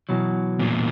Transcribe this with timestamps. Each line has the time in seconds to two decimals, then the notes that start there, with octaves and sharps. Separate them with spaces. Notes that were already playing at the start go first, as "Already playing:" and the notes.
0.09 B2 E3 F#3
0.59 E2 A#2